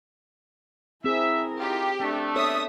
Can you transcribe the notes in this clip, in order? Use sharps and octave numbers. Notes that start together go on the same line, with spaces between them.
C4 E4 G#4 A#4 E5
D#4 F4 G4
A3 C4 D4
B3 A4 C#5 E5 D#6